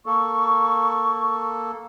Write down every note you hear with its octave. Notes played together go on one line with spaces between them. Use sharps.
A#3 A4 C#6